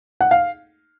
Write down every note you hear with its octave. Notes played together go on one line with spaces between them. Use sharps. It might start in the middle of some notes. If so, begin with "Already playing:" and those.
F#5
F5